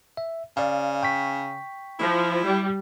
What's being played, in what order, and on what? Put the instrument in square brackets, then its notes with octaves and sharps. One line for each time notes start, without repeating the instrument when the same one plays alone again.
[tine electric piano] E5
[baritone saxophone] C#3 [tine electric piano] D5 F5
[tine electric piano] G5 C#6 B6
[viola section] F3 [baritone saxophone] E4
[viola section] G3